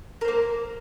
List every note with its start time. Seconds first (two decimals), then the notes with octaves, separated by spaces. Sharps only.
0.21 A#4
0.25 C5
0.28 A#3